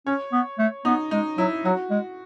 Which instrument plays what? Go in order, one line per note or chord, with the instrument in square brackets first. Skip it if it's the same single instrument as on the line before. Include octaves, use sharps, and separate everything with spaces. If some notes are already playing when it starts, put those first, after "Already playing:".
[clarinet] C#4 [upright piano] C#5
[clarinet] B3
A3
[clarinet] B3 [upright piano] D#4
[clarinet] G#3 [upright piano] D#4
[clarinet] F#3 [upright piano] E4
[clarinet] F#3 [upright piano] F#4
[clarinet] G#3